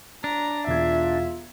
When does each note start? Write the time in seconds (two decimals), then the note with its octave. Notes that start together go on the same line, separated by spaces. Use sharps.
0.24 D4 A#5
0.67 E1 F4 E5 G#6